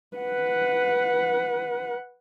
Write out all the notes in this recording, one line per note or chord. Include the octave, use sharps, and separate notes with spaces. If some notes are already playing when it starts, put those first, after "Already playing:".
B4 F#5